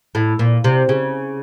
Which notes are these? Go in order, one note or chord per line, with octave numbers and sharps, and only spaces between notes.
A2
A#2
C3
C#3